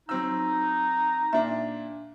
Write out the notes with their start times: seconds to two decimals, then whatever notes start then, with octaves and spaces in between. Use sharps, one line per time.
0.09 F#3 C4 D#4 E6
1.33 A#2 D4 E5